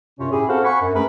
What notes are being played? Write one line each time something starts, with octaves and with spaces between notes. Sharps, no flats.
F#2 C3 C#4 F4 C#5
A2 C#4 E4 G4 G#4
C4 F#4 A4 C5 F5 F#5
F#5 G#5 B5 C#6
F#2
A3 C#4 G#4 A#4 B4